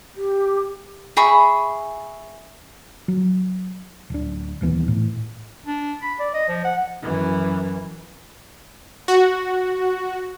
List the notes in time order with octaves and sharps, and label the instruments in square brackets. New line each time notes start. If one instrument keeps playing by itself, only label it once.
[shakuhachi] G4
[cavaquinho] G#4 E5 B5 C#6
[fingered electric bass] F#3
D1 D4
D#1 D#2 E3 B3
A2
[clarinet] D4
B5
D5
D#5
F3
F#5
[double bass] F#2 E3
[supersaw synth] F#4